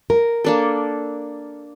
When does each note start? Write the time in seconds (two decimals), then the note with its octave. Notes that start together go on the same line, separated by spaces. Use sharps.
0.10 A#4
0.44 A#3 D4 A4